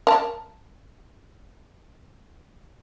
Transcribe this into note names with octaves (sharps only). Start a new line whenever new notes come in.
A#4 A5